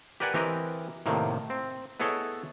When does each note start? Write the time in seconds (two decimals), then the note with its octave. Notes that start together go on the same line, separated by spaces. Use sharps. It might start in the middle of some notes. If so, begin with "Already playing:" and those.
0.20 G4 A#4 B4 D5 F#5 G#5
0.34 E3 C4 G4 A#4 D#5
1.06 A2 C3 D#3 A#3
1.50 C4
2.00 B3 E4 G#4 A4 C#5 D#5